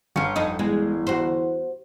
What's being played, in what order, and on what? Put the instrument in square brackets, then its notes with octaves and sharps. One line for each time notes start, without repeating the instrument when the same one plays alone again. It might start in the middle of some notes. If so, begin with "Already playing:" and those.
[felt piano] G1 C#7 [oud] C#4 F4
[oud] F2 D#4 D#5
[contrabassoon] E2 [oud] G#3
[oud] F#4 C5